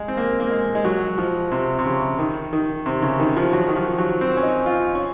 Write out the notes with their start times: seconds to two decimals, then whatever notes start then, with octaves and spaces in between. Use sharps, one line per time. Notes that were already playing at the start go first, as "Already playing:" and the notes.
Already playing: G#3
0.08 C4
0.17 A#3
0.40 A#3
0.50 G#3
0.75 G#3
0.85 F#3
1.18 F3
1.51 C3
1.79 C3
1.86 C#3
2.19 D#3
2.53 D#3
2.86 C3
3.02 C#3
3.20 D#3
3.37 F3
3.53 F#3
3.68 D#3
3.76 F3
3.98 F#3
4.21 C4
4.37 C#4
4.43 D#4
4.66 F4
4.95 C#4